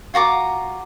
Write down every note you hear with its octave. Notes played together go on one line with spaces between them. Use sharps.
F4 F#4 A#5 D6